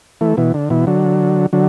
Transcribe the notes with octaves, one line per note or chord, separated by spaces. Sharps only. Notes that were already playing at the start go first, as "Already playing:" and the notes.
E3 A3
B2 E3
D3
B2 E3
D3 F#3
D3 F#3